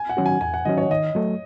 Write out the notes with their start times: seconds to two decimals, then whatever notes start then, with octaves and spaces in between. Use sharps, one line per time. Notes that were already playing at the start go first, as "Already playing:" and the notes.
Already playing: G#5
0.09 F#5
0.17 D#3 F#3 C#4 F#4
0.26 G#5
0.41 E2 G#5
0.54 F#5
0.65 D#3 F#3 C#4 F#4 D#5
0.78 C#5
0.90 D#3 D#5
1.15 F#3 A3